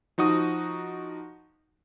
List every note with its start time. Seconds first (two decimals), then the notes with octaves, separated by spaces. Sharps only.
0.18 F3 D#4 F#4 D#6